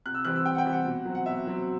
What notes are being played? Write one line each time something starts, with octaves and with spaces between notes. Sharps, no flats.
C3 F#6
E6
E3 G3 C4 F#6
E6
C3 G5
F#5
G5
E3 G3 C4
F#5
B2
F#3 C4
F#5
B2 E5
F#3 C4